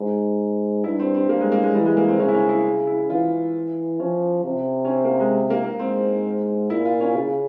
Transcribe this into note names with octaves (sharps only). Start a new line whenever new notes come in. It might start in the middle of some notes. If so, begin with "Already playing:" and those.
Already playing: G#2
G2 E4
C4
C4
G2 A#3
G#3
A#3
G#3
E3 G3
G#3
A#3
C4
C#3 C#4
E4
C#4
E4
E4
E3 F4
F3 C#4
C3
C#4
C4
A#3
G#3
A#3
A#3
G#2 C4
A#2 E4
F4
C#4
C#3 F4